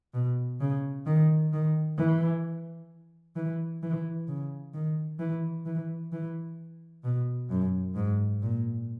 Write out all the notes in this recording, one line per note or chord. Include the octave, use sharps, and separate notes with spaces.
B2
C#3
D#3
D#3
E3
E3
E3
C#3
D#3
E3
E3
E3
B2
F#2
G#2
A#2